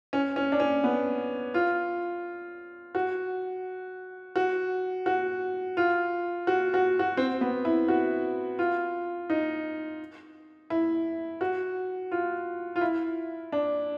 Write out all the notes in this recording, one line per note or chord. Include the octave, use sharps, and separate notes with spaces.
C#4
C#4
D4
C#4
B3
F4
F#4
F#4
F#4
F4
F#4
F#4
F#4
C4
B3
E4
F#4
F4
D#4
E4
F#4
F4
F4
E4
D4